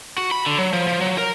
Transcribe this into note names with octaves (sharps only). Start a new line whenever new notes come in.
F#4
B5
D3
F#3
F3
F3
F#3
A#4